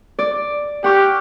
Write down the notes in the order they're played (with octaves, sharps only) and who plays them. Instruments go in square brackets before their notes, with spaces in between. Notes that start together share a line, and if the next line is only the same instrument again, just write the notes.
[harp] D5
[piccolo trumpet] G4 [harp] F#5 C#6 F6